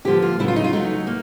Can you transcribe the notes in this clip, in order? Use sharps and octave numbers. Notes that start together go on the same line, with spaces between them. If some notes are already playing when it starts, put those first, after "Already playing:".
D3 F3 A#3 G4
F4
C#3 F#3 A3 E4
F4
D#4
F4
C#3 F#3 A3 D#4
A#3